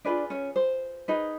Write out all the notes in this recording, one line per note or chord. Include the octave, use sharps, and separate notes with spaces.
D4 F4 G#4 B4 D5
C#4 C#5
C5
D#4 G#4 B4